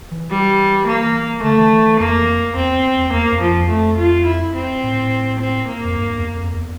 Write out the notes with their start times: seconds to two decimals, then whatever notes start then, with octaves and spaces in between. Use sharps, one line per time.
0.11 E3
0.30 G3
0.87 A#3
1.43 D3 A3
1.57 E3
1.71 E3
1.86 E3
2.00 F2 A#3
2.56 E2 C4
3.13 E2 A#3
3.32 F2
3.41 F3
3.51 F2
3.70 A3
3.98 F4
4.26 E4
4.55 C4
4.83 A2
5.40 C4
5.68 A#3
5.84 F2
5.97 G2
6.16 E2
6.34 F2
6.53 E2